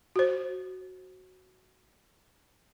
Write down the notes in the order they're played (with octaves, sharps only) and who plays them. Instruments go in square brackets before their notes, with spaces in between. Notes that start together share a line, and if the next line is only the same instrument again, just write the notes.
[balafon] F#4 C5